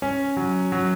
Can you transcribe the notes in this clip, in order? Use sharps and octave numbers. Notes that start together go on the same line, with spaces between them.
C#4
F#3
F#3